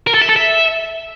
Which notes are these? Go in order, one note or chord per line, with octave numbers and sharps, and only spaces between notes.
A#4
A4
E5
A4
E5